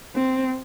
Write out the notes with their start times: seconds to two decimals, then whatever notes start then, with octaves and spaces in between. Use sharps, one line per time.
0.15 C4